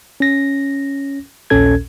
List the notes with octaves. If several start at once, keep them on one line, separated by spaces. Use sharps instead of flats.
C#4 A#6
A#1 D#2 A#2 C#4 A4 G#6